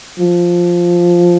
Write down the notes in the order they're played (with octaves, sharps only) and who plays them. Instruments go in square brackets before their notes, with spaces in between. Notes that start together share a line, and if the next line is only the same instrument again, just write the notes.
[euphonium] F3